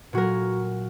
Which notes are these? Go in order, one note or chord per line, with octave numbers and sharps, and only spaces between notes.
A#2 F#3 F#4 A#4